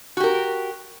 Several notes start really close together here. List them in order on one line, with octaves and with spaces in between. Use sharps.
F#4 G4 A#4